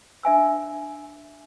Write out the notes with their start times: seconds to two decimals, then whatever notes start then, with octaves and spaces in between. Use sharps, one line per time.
0.23 D4 E5 G#5 E6